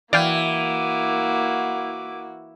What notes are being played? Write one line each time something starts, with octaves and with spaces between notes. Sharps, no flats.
E3 A#3 E4 F#4 D5 F5 G5 D6